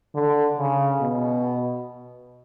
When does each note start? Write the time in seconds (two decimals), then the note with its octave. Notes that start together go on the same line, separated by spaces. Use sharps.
0.14 D3
0.57 C#3
1.01 B2